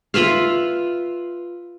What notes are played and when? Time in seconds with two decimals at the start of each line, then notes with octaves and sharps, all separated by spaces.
0.14 F4 B4 E5 F5